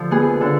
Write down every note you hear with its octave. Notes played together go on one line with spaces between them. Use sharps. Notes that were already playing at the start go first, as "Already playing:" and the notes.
Already playing: D3 F3
B3 G#4
D3